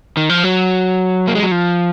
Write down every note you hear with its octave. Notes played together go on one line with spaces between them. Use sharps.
D#3
F3
F#3
A#3
G#3
F#3
F3